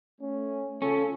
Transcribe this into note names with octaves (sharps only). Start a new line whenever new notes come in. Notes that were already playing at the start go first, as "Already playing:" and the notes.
A3 C#4
C#3 C#4 F4 A4